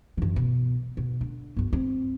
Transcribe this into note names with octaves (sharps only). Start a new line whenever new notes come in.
F#2 E3
B2
B2
D3
G1 D2
C4